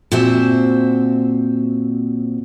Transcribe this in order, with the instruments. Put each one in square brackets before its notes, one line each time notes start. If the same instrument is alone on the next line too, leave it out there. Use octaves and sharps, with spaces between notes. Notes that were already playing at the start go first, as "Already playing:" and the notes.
[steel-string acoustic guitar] A#2 C4 F#4 C5 E5 A5